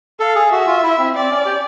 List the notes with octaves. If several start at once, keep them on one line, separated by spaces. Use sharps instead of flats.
A4 F5
G#4
F#4 E5
F4
E4
C4
C4 D5
C#4
G4